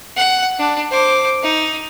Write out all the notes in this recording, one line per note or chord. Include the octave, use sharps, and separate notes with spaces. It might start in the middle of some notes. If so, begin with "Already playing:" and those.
F#5
D4
C5 D6
D#4